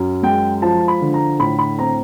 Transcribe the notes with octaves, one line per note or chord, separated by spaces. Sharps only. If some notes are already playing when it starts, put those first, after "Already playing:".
Already playing: F#2
G#3 G5
F3 A5
B5
D3
A#5
A2 B5
B5
C4 A#5